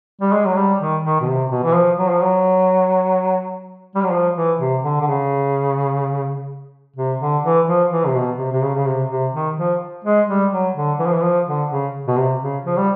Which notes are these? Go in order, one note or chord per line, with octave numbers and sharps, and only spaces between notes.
G3
G#3
F#3
G3
D#3
D#3
B2
C3
B2
E3
F3
F#3
F3
F#3
G3
F#3
F3
E3
C3
D3
D3
C#3
C3
D3
E3
F3
E3
C3
B2
C3
C3
C#3
C#3
C3
C3
D#3
F3
G#3
G3
F#3
D3
E3
F3
E3
F3
D3
C#3
B2
C3
C#3
F3
G3